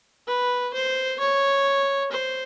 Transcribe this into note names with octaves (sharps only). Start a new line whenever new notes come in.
B4
C5
C#5
C5